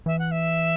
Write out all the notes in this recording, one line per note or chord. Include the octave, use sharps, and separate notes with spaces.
E3 E5
F#5
E5